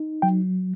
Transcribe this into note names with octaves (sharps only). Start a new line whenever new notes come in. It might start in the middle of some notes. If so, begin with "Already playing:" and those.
Already playing: D#4
F#3 G5